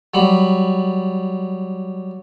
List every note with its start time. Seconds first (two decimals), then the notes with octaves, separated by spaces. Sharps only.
0.14 F#3 G3 B5